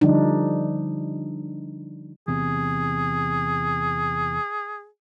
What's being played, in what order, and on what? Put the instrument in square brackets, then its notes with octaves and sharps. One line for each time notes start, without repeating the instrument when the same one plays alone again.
[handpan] D3 F3 G3 D4 D#4
[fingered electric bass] E2 C3 [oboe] G#4